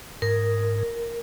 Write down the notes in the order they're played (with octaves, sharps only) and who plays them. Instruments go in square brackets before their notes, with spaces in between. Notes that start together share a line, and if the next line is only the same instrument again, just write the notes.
[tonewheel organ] G#2 [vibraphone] A#4